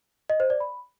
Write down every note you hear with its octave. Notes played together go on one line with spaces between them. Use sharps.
D#5
C5
D5
B5